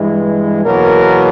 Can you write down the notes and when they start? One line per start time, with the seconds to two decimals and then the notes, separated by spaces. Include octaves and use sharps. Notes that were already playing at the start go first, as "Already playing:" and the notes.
Already playing: G2 E3 G#3
0.63 E2 B2 F#3 A#3 A#4